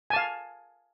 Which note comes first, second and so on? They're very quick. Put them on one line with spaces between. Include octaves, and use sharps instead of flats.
G#5 A5 F5